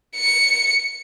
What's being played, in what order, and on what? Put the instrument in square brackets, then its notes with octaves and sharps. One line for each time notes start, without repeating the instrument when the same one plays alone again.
[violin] C#7